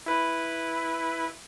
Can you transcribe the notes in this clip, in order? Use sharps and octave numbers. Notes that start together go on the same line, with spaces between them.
E4 B4